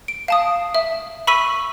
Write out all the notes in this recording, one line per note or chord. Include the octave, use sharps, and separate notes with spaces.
D7
F5 A5 D#6
E5
B5 C#6 E6 B6 D#7